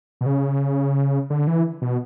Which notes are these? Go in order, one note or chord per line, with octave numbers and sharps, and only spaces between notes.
B2
C#3
D3
E3
B2